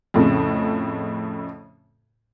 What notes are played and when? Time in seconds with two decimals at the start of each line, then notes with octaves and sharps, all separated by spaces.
0.14 F2 A2 C#3